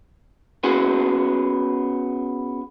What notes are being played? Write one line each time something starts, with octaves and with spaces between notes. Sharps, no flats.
B3 C#4 F#4 G#4